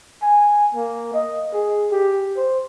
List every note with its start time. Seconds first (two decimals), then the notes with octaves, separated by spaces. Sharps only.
0.22 G#5
0.75 A#3
1.14 D#5
1.54 G#4
1.92 G4
2.37 C5